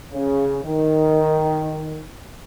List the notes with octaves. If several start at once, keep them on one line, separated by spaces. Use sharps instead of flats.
C#3
D#3